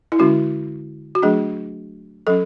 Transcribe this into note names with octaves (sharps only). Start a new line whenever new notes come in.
E4
D3 G#3 C#4 F#4
F#4
F#3 A3 D4 G#4
F#3 C#4 A4